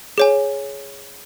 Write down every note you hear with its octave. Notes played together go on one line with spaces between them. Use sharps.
G#4 C#5 G#5